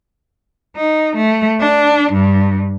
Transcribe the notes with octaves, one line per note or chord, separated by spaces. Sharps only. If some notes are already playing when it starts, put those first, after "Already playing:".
D#4
A3
D4
G2